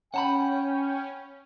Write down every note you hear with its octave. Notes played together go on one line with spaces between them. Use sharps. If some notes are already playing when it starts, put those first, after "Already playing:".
C#4 F#5 G5 A5 B5